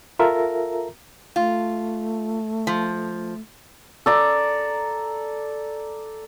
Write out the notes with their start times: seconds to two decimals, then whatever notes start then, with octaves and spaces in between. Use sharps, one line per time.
0.19 F4 A4 A#4 E5 A#5
1.36 A3 F4
2.67 F3
4.06 A4 D5 A#5